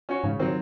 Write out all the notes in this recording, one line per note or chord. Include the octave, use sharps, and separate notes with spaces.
C#4 F#4 C#5
G#2 C#3
D#3 F#3 C4